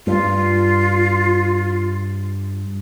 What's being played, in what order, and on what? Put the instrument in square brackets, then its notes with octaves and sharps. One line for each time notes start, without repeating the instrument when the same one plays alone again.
[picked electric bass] G2 [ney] F4